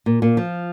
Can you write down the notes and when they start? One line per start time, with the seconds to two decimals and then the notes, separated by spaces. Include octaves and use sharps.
0.06 A#2
0.22 A#2
0.37 F3